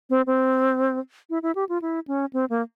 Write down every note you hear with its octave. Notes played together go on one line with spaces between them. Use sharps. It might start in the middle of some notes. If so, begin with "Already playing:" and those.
C4
C4
E4
E4
G4
F4
E4
C#4
C4
A#3